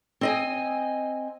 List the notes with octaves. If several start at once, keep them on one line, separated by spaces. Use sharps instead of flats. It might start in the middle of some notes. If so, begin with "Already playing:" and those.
C4 D#5 G#5